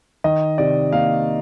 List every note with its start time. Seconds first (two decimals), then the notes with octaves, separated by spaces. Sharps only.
0.24 D#3 D#5
0.58 C3 D5
0.92 A#3 F5